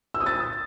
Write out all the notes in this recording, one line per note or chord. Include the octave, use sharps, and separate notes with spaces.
E6
D#6
A6